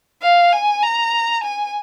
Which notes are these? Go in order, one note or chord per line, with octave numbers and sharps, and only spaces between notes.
F5
G#5
A#5
G#5